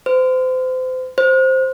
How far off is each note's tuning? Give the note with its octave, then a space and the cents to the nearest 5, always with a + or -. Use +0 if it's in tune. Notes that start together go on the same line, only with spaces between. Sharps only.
C5 -35
C5 +5